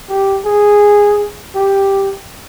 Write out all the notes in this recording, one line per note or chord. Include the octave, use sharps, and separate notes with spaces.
G4
G#4
G4